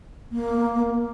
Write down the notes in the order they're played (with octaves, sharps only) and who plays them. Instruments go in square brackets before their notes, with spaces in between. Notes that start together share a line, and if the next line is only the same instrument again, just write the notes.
[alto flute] A#3